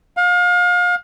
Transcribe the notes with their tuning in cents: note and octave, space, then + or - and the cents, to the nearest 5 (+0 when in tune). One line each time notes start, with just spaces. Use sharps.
F5 +35